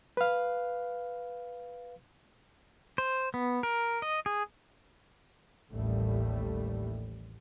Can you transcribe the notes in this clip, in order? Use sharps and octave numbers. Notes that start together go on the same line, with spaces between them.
B4 F5
C5
B3
A#4
D#5
G#4
A1 D#2 A2 G3 A3